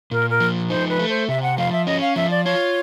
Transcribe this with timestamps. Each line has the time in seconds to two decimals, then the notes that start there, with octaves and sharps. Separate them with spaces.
0.11 A#2 A#4
0.30 A#4
0.40 F3
0.70 D#4 C5
0.89 B4
0.99 A3
1.09 C5
1.28 C3 E5
1.42 F#5
1.58 F3 F5
1.72 E5
1.87 C#4 D#5
2.01 F5
2.16 F3 E5
2.31 D5
2.45 F4 C#5